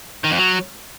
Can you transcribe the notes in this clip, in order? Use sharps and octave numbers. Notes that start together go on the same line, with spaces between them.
D#3
F2
F#3